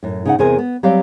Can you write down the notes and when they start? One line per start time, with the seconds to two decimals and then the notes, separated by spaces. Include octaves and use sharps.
0.03 F#2 A2
0.26 C#3 D#4 F#5
0.39 E2 C3 G#4 A#4 C5 G#5
0.58 B3
0.83 F#3 G3 C4 G4 F5